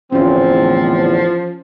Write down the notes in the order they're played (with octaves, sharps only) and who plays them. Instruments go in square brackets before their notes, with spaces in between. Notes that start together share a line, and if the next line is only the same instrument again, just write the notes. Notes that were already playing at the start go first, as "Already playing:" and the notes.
[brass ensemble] E2 A2 D3 [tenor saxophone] F3 [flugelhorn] C4 [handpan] C#4 F4